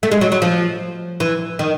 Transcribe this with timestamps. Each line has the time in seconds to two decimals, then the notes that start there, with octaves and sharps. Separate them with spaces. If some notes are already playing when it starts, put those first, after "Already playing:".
0.03 A3
0.11 G#3
0.21 F#3
0.32 F#3
0.42 F3
1.20 E3
1.59 D#3